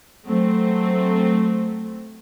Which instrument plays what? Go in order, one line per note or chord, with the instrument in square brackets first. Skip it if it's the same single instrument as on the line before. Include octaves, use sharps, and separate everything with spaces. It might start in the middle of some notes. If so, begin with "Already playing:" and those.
[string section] F#3 A3 C4